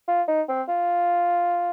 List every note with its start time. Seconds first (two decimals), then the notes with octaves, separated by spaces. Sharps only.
0.08 F4
0.28 D#4
0.49 C4
0.68 F4